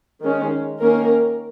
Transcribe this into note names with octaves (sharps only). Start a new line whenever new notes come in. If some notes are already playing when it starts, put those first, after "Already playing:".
D#3 G#3 C#4
D#3 A#3 C#4 A#4